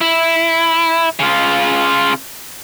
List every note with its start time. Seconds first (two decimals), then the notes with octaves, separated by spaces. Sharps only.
0.01 E4
1.20 C#3 F4